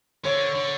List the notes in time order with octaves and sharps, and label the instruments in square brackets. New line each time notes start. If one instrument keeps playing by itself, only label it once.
[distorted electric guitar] D3 [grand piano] C#5
[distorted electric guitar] D3